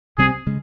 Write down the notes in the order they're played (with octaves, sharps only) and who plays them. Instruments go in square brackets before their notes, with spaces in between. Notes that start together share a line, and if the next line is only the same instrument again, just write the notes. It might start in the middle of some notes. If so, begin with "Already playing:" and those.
[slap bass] C2 C3 G3 C4 [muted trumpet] G#4
[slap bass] C#3 G#3